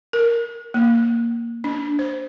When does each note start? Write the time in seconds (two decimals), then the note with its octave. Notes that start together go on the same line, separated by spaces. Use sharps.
0.13 A#4
0.74 A#3
1.64 D4
1.99 C5